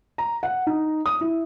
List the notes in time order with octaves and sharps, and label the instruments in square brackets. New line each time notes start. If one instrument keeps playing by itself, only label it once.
[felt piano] A#5
F#5
D#4
D#6
E4